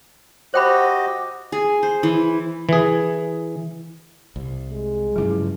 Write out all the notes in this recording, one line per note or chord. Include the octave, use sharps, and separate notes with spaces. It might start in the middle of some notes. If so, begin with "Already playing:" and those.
F#4 G4 C5 D#5 G5 B5
G#4
C5
E3
E3 G#4
C2
G#3
G2 C#3 F3 F#3 E4